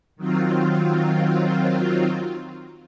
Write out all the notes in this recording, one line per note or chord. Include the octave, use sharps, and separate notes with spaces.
D#3 F#3 C4 F4